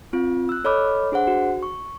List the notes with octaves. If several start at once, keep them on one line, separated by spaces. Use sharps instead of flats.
C4 F4
E6 F#6
A4 C#5 D#5 B5 D6 F6
D4 G#4 C5 F#5
F#4
C#6